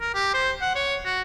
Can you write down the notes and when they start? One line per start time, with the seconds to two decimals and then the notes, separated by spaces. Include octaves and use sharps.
0.01 A#4
0.14 G4
0.34 C5
0.61 F#5
0.75 C#5
1.05 F#4